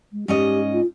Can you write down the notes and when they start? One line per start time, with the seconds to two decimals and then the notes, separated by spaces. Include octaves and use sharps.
0.13 G#3
0.28 G#2 C#4 G4 D#5
0.73 F4